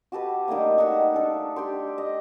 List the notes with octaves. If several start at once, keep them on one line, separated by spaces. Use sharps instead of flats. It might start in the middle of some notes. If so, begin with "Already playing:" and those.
F#4 G4 A4 B4
D#3 G3 A3 A#3
D#4 E5 F#5
D4 A4
G4 G5 C6
D#5